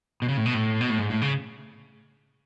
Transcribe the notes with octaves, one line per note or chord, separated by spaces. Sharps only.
B2
C#3
A2
B2
A2
B2
A2
G#2
A2
C#3